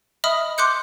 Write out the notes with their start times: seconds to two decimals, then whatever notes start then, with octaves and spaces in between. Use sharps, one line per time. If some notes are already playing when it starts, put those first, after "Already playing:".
0.24 D#5 E5 B5 D#6 F6
0.58 C6 D6 F#6 G6 C#7